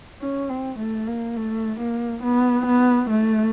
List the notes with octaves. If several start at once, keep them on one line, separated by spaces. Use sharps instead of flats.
C#4
C4
A3
A#3
A3
A#3
B3
B3
A3